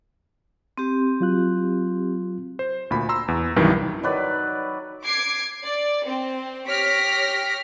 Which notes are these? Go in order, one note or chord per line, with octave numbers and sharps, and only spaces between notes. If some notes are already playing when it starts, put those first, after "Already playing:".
C4 G4
F#3 F4 F#6
C5
D2 A#2 B5
A#5 C6 E6
E2
C2 G2 D#3 E3 F#3
D#3 F#3 B4 D5
D6 G#6 C7
D5
C4
G4 C#5 F6 A#6 B6 D7